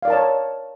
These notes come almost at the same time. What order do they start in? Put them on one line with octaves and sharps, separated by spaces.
F5 D5 A#4 A5 C#5